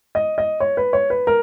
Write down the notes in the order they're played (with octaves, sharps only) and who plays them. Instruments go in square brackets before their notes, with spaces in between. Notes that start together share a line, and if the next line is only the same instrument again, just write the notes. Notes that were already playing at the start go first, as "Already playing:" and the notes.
[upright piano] D#5
D#5
C#5
B4
C#5
B4
A#4